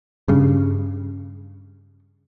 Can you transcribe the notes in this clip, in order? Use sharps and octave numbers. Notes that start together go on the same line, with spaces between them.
G2 C#3